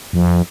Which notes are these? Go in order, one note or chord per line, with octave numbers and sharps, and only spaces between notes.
F2